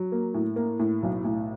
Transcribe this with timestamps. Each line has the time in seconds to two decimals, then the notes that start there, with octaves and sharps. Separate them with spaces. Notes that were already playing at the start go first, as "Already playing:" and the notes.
Already playing: F#3
0.12 A#3
0.34 A2
0.56 A#3
0.79 A2
1.03 B1
1.24 A2